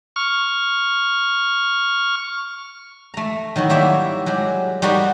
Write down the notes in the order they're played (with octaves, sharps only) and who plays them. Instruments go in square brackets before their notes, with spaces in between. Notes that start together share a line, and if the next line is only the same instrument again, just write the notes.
[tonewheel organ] C#6 F6
[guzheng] A3 A#5
D#3 F#3 E4 F#4
G3 A#3 E4 C#5 E5 G5
F#3 G#3 G4
G3 D#4 F#4 A#4 B5